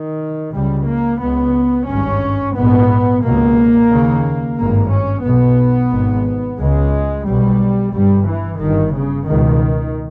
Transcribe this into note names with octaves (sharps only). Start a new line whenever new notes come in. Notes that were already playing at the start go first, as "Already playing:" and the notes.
Already playing: D#3
C#2 C#3 G3
A#3
C#2 C#3 B3
G#1 G2 C#4
A#1 G#2 B3
C#2 B2 A#3
D#2 C#3
G#1 G2 A#3
C#4
B1 B2 B3
G#1 G#2
C#2 C#3 G#3
B1 B2 G3
G1 G2 G3
E3
G1 G2 D#3
C#3
C#2 B2 D#3